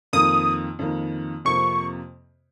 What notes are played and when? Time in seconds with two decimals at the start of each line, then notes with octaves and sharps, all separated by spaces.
0.13 F2 D#3 A#3 D#6
0.79 F2 D#3 A#3
1.45 F2 C3 F3 A#3 C#6